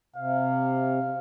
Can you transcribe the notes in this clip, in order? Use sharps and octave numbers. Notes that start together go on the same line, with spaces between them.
C3 F5